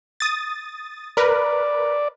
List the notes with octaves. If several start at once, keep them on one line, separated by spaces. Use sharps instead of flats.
D#6 A6
A#4 B4 D5